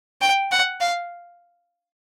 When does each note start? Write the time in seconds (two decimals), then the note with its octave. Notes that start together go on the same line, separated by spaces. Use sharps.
0.21 G5
0.51 F#5
0.81 F5